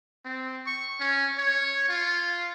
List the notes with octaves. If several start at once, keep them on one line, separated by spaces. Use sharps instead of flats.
C4
C#6
C#4
C#5
F4